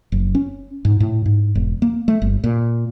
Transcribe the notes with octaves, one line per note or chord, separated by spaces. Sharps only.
F#1
C#4
G#2
A2
G#2
E1
A#3
A3
G1
A#2